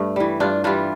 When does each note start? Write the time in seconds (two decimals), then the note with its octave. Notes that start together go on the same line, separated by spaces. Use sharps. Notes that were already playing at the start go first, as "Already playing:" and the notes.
Already playing: G2 A3
0.16 E3 G3
0.40 G2 D4 F4
0.64 E3 G3 D4 F4